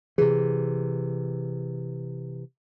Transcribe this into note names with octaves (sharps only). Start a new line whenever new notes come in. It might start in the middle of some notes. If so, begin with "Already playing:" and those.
C3 E3 G#4